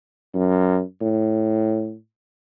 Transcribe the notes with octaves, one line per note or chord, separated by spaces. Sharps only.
F#2
A2